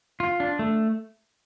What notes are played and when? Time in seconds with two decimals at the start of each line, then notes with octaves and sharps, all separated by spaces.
0.20 F4
0.40 D4
0.59 A3